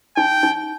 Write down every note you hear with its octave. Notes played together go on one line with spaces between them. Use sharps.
D#4 G5
D#4